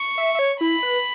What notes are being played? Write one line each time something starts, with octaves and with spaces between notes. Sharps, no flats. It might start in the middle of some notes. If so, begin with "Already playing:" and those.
Already playing: C#6
E5
E5
C#5
E4 B5
B4